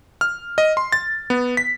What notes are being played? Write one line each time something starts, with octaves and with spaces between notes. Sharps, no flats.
F6
D#5
C6
A6
B3
B6